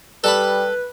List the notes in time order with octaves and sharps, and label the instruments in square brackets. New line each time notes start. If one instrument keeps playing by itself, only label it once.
[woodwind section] G3 [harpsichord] A4 A5 B5 [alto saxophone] B4